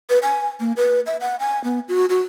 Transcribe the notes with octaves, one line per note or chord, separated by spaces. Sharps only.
B4
G#5
A#3
B4
E5
F#5
G#5
B3
F#4
F#4